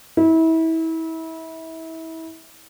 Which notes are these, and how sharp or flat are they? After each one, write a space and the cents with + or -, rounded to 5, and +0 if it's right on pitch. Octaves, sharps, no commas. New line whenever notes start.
E4 -30